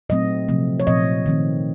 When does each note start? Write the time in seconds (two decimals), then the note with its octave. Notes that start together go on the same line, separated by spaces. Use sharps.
0.09 A#2 F#3 A3 C4 D#5
0.48 C3 F3 A3 C4
0.80 C#5
0.87 A#2 F3 C4 D#5
1.26 D#3 A3 C4